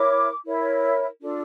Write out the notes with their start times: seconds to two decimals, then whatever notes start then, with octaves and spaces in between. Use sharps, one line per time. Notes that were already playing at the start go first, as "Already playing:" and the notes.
Already playing: E4 A#4 C#5 D6
0.44 E4 A#4 C#5
1.20 D4 F4 A4